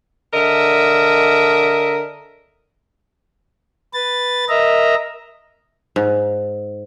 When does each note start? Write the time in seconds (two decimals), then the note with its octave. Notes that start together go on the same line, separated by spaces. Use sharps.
0.33 D3 A#4 D#5 E5
3.94 B4 A6
4.49 A#4 D#5 E5 A#5
5.96 G#2